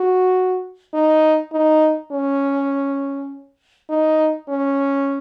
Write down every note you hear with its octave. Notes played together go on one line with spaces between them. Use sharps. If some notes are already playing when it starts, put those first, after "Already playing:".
Already playing: F#4
D#4
D#4
C#4
D#4
C#4